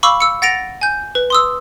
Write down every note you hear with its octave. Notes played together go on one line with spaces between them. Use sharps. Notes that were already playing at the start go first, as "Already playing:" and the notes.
F5 B5 C#6 D6 E6
E6 C#7
F#5 A6 A#6 D7 F7
G#5 G6
B4
C6 D#6 E6